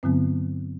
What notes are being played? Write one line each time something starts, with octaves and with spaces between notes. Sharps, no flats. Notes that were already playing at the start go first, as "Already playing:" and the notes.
G2 D3 F#3 B3 C4